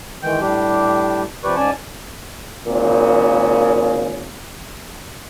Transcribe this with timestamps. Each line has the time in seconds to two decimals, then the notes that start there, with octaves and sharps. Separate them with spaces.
0.23 D#3 E3 G#3 G5 G6
0.41 A2 G3 D4 G4
1.44 C3 F3 G4 B4 D5 C#6
1.56 G#2 C#4 D5 G#5 A5
2.67 G#1 A#2 C#3